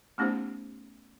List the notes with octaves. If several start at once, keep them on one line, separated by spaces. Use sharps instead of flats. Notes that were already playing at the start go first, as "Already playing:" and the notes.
A3 B3 C#4 D#4 G4 C5